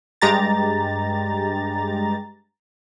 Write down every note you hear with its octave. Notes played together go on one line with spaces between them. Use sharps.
G2 G#3 G4 A#5 A6